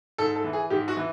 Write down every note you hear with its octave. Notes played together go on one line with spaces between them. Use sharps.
G#2 A4
A4
E3
G#4
G#2 G4
F#4
E3